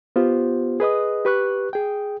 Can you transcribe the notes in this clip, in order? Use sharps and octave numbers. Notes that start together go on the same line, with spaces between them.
B3 F4 G4 C5
G#4 B4 D#5 D#6
G4 B4 C#6 F#6
G#4 G5